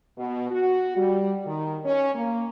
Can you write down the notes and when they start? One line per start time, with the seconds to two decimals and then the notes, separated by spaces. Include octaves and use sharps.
0.17 B2
0.50 F#4
0.96 G3
1.46 D#3
1.84 C#4
2.15 A#3